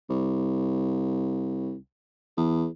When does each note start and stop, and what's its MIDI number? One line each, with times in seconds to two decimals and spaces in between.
0.09 1.77 36
2.37 2.67 40